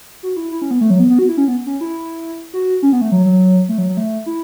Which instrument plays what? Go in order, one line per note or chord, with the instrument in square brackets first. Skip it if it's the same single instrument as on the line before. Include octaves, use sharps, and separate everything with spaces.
[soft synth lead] F#4
E4
E4
C#4
B3
A3
F#3
B3
B3
F#4
E4
C#4
B3
C#4
E4
F#4
C#4
B3
A3
F#3
F#3
A3
F#3
F#3
A3
E4